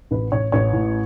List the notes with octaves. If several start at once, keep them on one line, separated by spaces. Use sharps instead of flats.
A1 B4
A1 C#5
A1 C#5
A2